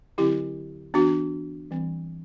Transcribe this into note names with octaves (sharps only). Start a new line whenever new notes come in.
D3 F#3 C4 E4 G4
E3 B3 D4 F#4
E3 G3 C4